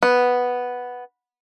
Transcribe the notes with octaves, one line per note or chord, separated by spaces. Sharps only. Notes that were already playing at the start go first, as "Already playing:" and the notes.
B3